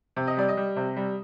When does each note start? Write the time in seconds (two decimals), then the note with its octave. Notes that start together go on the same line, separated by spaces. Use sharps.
0.16 C3
0.27 D#5
0.37 G3 D5
0.49 D#5
0.57 G3
0.76 C3
0.96 G3